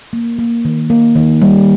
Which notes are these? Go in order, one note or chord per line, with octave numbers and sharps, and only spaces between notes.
A#3
A#3
D#3
A#3
D#3
G3